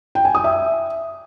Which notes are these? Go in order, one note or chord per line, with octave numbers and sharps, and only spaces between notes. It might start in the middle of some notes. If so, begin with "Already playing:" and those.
G5
G#5
D#6
E5